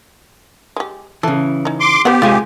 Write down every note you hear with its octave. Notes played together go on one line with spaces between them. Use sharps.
G#3 G4
C#3 E3 A4
C#4 D#4
C6 D6
B3 G4 C5 F5 F#5
C2 G#3 F4 G#5